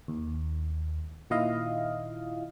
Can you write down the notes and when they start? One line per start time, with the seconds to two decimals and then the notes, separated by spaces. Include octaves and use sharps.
0.08 D#2
1.30 A#2 D#3 E4 F4 D#5 F5